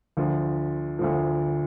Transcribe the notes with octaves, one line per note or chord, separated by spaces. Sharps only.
D2 D3 F3
D2 D3 F3